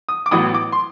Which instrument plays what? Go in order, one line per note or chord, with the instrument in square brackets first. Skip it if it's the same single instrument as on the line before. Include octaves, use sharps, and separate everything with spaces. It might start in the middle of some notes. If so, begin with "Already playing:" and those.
[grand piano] D#6
D6
A1 A2 F#3 B3 D#6
D6
C6